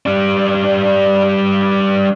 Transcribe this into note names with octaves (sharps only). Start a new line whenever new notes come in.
G3 D4